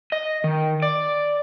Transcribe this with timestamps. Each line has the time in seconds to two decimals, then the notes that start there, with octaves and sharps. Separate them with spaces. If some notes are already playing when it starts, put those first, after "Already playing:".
0.12 D#5
0.44 D#3
0.82 D5